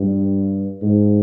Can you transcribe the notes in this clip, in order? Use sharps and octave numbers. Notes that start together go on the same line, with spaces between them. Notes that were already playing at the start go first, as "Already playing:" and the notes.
Already playing: G2
G#2